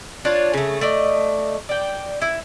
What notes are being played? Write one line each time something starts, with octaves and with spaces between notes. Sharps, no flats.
D4 F4 C#5
C#3 A3
A3 D5 D#5
D5 G5
E4